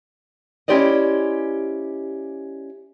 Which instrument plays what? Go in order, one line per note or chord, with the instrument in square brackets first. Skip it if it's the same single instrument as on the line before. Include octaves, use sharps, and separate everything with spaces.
[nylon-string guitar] C#4 E4 G4 C5 D5 D#5